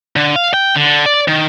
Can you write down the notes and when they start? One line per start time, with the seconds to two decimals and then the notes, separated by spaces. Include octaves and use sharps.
0.16 D3
0.36 F5
0.54 G5
0.76 D3
1.06 D5
1.28 D#3